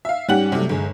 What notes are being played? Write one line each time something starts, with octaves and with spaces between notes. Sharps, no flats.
E5 F5
G#2 G3 C#4 G4 F#5 F#7
C3 F#3 G3 A3
G1 G#3